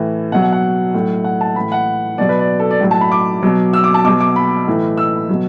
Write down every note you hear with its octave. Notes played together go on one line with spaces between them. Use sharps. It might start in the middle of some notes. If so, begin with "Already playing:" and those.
Already playing: A2 E3
B2 F#3 F#5
F#5
F#5
A2 F#3
F#5
A5
A2 E3 B5
F#5
B2 F#3 D5
B4
D5
A4
D5
A2 F#3
A5
B5
D6
B2 F#3
E6
D6
A5
B2 F#3 D6
D6
B5
A2 E3
E6
B2 F#3